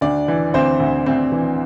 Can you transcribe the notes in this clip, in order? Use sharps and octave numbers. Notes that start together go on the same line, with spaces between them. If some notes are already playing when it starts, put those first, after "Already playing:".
D2 D4 D5
E3
D2 C4 C5
D2
D2 C4 C5
E3